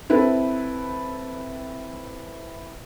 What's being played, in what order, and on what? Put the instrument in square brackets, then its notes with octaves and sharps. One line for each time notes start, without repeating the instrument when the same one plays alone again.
[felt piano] C4 E4 A4 B4